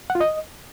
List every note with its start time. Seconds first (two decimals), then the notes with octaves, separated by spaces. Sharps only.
0.10 F#5
0.15 F4
0.21 D#5